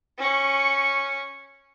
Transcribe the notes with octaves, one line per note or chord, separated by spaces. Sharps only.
C#4 C#6